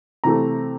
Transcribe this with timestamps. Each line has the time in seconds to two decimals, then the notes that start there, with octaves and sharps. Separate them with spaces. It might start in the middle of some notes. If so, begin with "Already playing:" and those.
0.24 C3 E3 A3 A#5